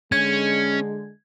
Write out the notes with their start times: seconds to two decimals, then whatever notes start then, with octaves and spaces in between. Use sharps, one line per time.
0.12 D3 G#3 C#4 G#6